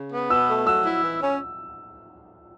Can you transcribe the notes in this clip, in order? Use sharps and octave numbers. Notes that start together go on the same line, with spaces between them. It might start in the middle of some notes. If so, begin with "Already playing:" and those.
Already playing: C#3
B3
B2 E6
A3
F#3 E6
E4
E3
C#4